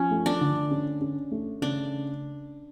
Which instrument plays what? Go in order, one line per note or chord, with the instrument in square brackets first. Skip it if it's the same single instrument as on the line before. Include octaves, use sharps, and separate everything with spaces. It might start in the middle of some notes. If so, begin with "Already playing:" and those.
Already playing: [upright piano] F3 [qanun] C#4
[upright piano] A3
[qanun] D4
[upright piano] D3
C#4
C#4
A3
[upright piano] C#3 [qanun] D4